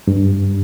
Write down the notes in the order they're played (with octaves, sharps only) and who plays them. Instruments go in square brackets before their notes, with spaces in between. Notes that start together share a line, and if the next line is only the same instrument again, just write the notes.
[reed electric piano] G2